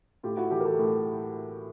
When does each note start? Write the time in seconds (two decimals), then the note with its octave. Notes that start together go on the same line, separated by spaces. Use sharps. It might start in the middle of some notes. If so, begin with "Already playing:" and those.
0.23 A2 F4 G4
0.37 E4 F#4
0.51 E3 G4 A4
0.60 A#4
0.65 G4 A4
0.79 A2